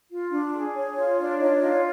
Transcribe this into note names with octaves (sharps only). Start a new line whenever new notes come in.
F4
D4
G#4
C#5
F4
D4
D#4 C#5 D#5
D#4 F4 D#5